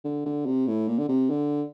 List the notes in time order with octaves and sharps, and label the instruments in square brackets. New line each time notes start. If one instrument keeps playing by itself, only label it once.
[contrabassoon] D3
D3
C3
A2
A#2
D3
C3
D3